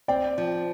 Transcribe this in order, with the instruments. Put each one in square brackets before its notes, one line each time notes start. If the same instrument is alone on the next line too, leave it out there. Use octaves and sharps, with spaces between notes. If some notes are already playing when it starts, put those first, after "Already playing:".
[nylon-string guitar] C4 [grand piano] D5 G5
[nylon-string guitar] F3